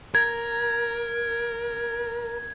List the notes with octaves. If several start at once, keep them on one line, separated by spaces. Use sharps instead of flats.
A#4 G#6